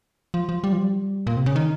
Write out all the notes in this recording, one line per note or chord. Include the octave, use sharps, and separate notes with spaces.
F3
F3
G3
F3
G3
A#2
C3
C#3
D#3